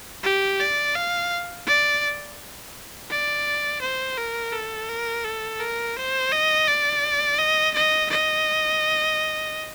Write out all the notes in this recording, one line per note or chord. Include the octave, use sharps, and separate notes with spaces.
G4
D5
F5
D5
D5
C5
A#4
A4
A#4
A4
A#4
C5
D#5
D5
D#5
D#5
D#5